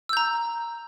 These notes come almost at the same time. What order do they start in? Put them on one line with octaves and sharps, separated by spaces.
E6 G6 A#5